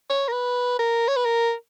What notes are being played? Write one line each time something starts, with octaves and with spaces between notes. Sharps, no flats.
C#5
A#4
B4
A#4
C#5
B4
A#4